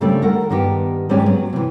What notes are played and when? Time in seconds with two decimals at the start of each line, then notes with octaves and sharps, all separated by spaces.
0.01 F#2 C#3 G3 A3 C4 D4
0.22 D#3 A4 A#4 F#5
0.50 G2 D#3 B3 G4
1.09 G#2 G3 G#3 C4 C#4 G4
1.22 F#3 B3
1.53 C3 E3